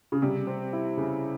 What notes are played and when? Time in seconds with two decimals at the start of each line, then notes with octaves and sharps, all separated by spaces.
0.12 C#3
0.22 C3 G3
0.47 C4
0.73 E4
0.97 C#3